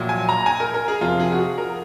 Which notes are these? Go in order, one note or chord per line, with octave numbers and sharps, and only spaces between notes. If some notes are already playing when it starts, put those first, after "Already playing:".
Already playing: A#1 A#2 F#3
G#5
A#5
G#5
A#4
A#4
G#4
F2 C3 F3 F4
G#4
F#4
G#4
A#4